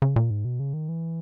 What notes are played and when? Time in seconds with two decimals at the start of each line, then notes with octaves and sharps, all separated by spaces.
0.02 C#3
0.16 A#2
0.30 G#2
0.45 B2
0.60 C#3
0.73 D#3
0.89 E3